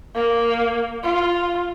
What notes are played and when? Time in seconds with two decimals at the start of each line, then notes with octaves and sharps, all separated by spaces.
0.15 A#3
1.04 F4